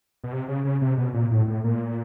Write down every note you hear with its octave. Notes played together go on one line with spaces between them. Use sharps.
B2
C3
C#3
C#3
C3
B2
A#2
A2
A2
A#2